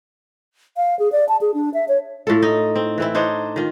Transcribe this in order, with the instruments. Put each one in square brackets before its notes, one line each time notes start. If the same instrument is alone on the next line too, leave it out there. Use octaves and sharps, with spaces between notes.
[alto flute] F5
G#4
D5
A5
G#4
D4
E5
C#5
[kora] A2 F4 A4
D#4
C4
E3 C4 E4
D4 D#4 C5 C#5
D#3 F4